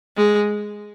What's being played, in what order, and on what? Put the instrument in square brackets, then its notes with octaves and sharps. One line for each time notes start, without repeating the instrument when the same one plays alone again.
[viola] G#3